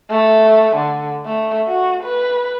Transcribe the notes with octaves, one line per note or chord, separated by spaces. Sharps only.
A3
D3
A3
F#4
B4